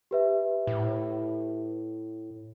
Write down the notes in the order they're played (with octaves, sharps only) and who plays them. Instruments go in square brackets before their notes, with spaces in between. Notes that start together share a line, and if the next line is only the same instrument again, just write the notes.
[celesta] G4 B4 E5
[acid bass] A2